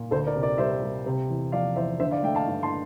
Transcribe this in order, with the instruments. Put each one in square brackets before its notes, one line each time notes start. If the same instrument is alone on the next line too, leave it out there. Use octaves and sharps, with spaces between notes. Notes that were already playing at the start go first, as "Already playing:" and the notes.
Already playing: [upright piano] A#2
D2 A4 C5
A#4 D5
C3
A#4 D5
G3 C5 E5
G3
C3
E2
F3 D5 F5
E2 C5 E5
D3 C5 E5
D5 F5
A3 E5 G5
F5 A5
G2
A5 C6